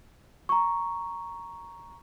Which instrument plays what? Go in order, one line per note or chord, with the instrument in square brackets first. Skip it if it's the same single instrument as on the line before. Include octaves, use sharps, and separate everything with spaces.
[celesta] A#5 C#6